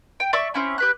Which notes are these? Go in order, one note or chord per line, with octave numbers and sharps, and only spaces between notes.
G5
D5 E5 C#6 E6
C4 C#4 E4
G4 B4 F#6